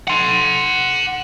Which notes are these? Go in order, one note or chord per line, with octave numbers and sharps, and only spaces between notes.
F#5 C6